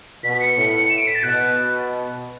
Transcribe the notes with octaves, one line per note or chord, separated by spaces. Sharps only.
B2 B6
B6
C#7
A2 C#7
C#7
E7
D7
B6
A6
B2 F#6